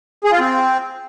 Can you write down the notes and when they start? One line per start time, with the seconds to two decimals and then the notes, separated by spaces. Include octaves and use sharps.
0.24 G#4
0.32 F4
0.40 C4